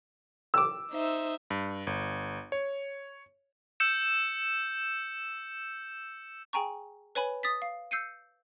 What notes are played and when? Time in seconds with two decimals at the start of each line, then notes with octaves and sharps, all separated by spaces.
0.54 D6 E6
0.92 D#4 C5 E5
1.50 G2
1.87 G1
2.52 C#5
3.80 E6 G6 C#7 E7
6.53 G#4 G5 G#5 A#5 C#6
7.15 B4 C#5 G#5 B5
7.43 D#6 A6 B6
7.62 F5
7.91 E6 G6 C7 C#7 D#7